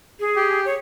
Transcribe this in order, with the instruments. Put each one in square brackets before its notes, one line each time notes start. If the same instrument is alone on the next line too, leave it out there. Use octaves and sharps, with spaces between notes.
[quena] G#4
[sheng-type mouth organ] G4
[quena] C#5